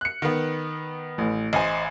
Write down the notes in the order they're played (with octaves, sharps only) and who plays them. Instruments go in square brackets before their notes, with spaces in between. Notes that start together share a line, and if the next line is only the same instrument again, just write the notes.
[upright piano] F#6 C#7
D#3 B3
[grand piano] A1
[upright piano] A1 G#5 [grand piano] C5 D#5